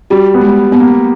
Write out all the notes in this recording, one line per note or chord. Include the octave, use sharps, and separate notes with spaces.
G3 F#4
B3
G#3
B3
A#3